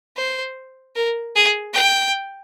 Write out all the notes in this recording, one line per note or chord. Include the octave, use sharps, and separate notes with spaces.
C5
A#4
G#4
G5